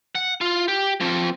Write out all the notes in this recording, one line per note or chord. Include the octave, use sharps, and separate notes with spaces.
F#5
F4
G4
F3 C4